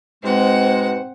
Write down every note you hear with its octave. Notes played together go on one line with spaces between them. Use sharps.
G#2 B2 G#3 C4 F#5